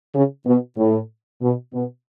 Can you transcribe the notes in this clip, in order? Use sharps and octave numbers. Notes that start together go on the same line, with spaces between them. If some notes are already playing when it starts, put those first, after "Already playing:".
C#3
B2
A2
B2
B2